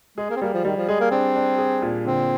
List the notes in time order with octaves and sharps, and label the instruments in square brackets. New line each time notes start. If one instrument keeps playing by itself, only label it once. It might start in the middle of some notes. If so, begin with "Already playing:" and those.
[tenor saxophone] G#3 [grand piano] G#4
[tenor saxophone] A#3
C4
[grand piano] G3 [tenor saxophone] A#3
[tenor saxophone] F3
[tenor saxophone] D#3 [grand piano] G3
[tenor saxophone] F3
[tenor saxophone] G#3 [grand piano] G#4
[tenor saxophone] A#3
[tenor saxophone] C4 [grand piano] D4
[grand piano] D4
G#4
A#2
[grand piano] D3 [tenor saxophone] C4